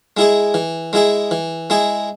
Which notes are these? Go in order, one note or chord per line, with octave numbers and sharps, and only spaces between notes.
G#3 E4 G#4
E3
G#3 E4 G#4
E3
G#3 E4 G#4